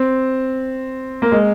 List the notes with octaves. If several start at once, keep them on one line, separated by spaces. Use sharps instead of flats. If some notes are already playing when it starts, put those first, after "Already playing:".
Already playing: C4
A#3
G#3